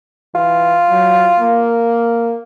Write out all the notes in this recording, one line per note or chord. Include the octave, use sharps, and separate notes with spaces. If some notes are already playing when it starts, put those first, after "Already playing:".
E3 F4
F#3
A#3